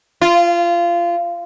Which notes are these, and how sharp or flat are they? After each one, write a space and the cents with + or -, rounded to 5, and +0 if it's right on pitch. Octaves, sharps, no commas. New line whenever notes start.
F4 -20